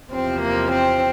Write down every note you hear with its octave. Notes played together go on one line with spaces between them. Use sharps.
E2 C3 F3 C4
A#3
C4